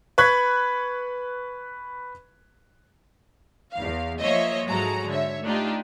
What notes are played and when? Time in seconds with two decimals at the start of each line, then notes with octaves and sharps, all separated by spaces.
0.18 B4 B5 C#6 F#6 G#6 B6
3.73 E2 F5
4.20 F3 A#3 C#5 D#5 E5
4.67 G#2 F#3 G#3 F#4 A4 A#5
5.09 D3 C#5 E5
5.43 A3 D4 D#4 F4 G4